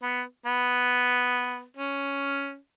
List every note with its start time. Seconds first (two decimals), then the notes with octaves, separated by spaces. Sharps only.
0.02 B3
0.46 B3
1.77 C#4